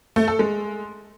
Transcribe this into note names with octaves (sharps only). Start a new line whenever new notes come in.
A3
A4
G#3